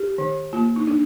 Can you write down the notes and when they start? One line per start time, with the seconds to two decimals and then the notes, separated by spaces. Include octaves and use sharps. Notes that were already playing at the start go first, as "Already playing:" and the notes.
Already playing: G4
0.18 D#3
0.53 A#3 F4
0.76 D#4
0.87 D4